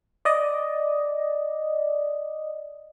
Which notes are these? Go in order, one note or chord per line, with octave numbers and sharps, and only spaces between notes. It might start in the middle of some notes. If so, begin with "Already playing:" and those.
D5 D#5